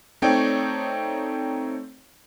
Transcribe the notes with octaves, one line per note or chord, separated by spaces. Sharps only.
A3 C4 D#4 C#5 D5 G5